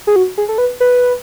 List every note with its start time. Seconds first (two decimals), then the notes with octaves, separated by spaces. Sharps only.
0.07 G#4
0.16 F#4
0.38 G#4
0.49 A4
0.58 B4
0.80 B4